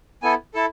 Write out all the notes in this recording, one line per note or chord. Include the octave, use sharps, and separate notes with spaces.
B3 E4 A4 G#5
E4 A4 A5